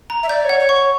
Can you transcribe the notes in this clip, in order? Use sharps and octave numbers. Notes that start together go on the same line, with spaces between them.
A#5
E5
D5 G6
C#5 F#5
C#5
C#6
C#5